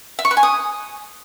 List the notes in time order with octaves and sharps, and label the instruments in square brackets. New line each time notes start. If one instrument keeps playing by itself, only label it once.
[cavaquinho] E5
C#6
B4
G#5
D#6